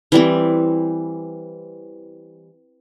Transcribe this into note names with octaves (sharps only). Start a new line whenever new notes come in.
E3 G3 C4